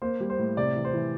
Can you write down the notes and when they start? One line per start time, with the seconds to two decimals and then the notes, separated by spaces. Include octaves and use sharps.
0.02 A#3 C5
0.20 G3
0.30 C5
0.38 A2
0.57 C3 D5
0.75 E3
0.85 C5
0.94 E3